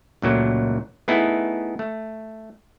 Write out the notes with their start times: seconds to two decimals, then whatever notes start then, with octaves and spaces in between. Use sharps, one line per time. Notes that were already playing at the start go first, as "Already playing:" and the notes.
0.22 C#2 A#2 F#3 A3
1.08 A3 B3 D#4 E4 G#4
1.79 A3